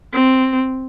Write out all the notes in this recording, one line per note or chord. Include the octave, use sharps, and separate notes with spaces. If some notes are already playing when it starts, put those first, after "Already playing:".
C4